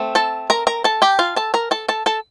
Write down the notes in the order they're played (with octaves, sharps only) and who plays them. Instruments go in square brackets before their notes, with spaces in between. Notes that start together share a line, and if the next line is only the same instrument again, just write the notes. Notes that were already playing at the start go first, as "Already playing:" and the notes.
Already playing: [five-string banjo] A3 C4
A4 A5
A#4 A#5
A#4 A#5
A4 A5
G4 G5
F4 F5
A4 A5
A#4 A#5
A4 A5
A4 A5
A4 A5